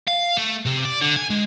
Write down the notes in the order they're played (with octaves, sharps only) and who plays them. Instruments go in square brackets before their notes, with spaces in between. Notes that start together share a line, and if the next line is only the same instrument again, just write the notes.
[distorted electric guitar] F5
A3
C3
D5
D3
G#5
G#3